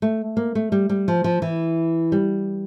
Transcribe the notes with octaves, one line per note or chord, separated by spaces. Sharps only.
A3
A#3
A3
G3
G3
F3
F3
E3
G3